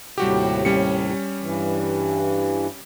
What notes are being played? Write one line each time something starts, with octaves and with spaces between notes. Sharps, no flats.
D#2 A2 C3 G3 F#4 G4
G3 C#4 C#7
G2 E3